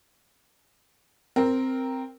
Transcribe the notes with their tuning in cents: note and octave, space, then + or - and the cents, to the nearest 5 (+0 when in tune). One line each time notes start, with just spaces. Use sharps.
C4 +0 A#4 +0